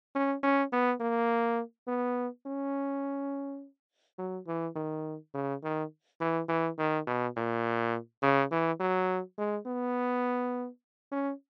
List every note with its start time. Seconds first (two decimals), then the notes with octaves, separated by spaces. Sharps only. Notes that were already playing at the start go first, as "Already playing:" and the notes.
0.15 C#4
0.43 C#4
0.73 B3
1.00 A#3
1.87 B3
2.46 C#4
4.18 F#3
4.47 E3
4.76 D#3
5.34 C#3
5.63 D#3
6.21 E3
6.49 E3
6.79 D#3
7.07 B2
7.37 A#2
8.23 C#3
8.51 E3
8.80 F#3
9.38 G#3
9.66 B3
11.12 C#4